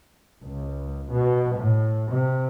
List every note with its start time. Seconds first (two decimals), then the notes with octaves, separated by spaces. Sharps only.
0.43 C#2
1.10 B2
1.57 A2
2.10 C3